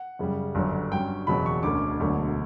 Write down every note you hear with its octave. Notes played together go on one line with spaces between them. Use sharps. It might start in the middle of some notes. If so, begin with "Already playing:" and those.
Already playing: F#5
F#2 C#3 G3
G1 F#2 D3 F#3 C#4
G2 F#3 C#4 G5
F#1 E2 B2 F#3 B5
C#6
E1 D2 D3 A3 C#4 D6
E1 D2 D3 F#3 A3